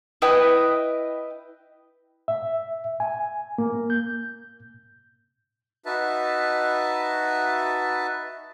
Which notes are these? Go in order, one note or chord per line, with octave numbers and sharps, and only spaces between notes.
E4 B4 D#5 G5
E5
G#5
A#3
G6
D#4 F#4 B4 E5 A5